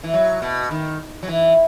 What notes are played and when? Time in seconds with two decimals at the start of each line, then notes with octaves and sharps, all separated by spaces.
0.04 E3
0.14 F#3
0.42 B2
0.71 D#3
1.23 F#3
1.28 E3